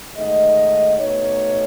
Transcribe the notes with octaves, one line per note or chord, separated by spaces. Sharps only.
G#2 D#3 A3 D#5
B2 A3 D#4 C#5